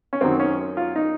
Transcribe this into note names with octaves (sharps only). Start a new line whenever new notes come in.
C#4
F#2 D#3 F#3 C4
C#4
F4
D#4